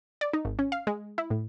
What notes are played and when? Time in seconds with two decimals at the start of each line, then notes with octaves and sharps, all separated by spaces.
0.21 D5
0.33 D#4
0.45 G#1
0.59 C#4
0.72 F5
0.87 G#3
1.18 E4
1.30 A2